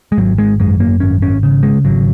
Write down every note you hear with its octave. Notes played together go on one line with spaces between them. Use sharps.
G#3
G#1 F#3
G#3
F#2 G#3
A#3
G#1 C#4
C#4
C#3
G#3
G#1 F#3